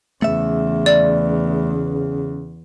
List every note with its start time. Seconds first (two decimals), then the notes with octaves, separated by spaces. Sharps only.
0.22 E2 C#3 A3 E5
0.86 D5